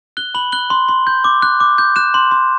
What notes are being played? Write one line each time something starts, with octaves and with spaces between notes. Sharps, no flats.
F#6 G7
B5 F#7
F#6 G7
C6
C6
G6
D6
F#6
D6
G6
F#6 E7
C6
C6